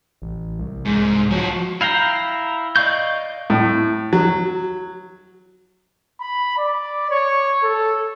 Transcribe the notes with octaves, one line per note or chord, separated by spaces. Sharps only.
A1
C2
G#2
F3 F#3 F#4
E4 F5 G5 A#5
D5 D#5 F5 C#6 G6
A2
F#3
B5
D5
C#5
A4